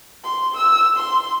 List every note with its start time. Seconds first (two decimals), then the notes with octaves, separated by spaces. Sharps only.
0.24 C6
0.57 E6
0.97 C6